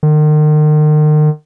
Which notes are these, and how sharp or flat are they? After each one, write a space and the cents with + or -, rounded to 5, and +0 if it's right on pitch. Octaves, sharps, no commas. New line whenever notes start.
D#3 -40